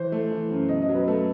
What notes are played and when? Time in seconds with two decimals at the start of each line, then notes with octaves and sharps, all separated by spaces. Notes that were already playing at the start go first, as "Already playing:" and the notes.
Already playing: E3 C5
0.12 A3
0.31 E3
0.51 F#2
0.69 B2 D#5
0.82 D#5
0.89 F#3
0.95 B4
1.07 A3 A4